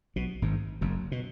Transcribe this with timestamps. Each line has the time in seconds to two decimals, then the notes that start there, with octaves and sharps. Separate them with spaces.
0.16 B1 B2
0.42 G#1 G#2
0.81 F#1 F#2
1.12 B2